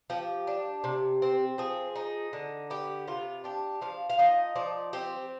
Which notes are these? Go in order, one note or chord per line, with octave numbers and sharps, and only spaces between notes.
F3 G4
D4
C3
C4
F3 G#4
D#4
D3
B3 G4
C3 F4
D4 G4
F3 F5
F5
D#4 D#5
F3 D5
C4 G4